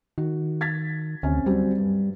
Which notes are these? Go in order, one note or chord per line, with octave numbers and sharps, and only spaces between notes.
D#3 F#4
G#6 A6 B6
D2 C3 C#4
F#3 G3 C4
G2